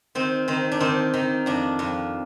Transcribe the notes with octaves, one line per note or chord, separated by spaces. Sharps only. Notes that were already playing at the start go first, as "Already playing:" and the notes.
D#3 C4
D#3 C4
D4
D#3 C4
D#3
F2 D4
F2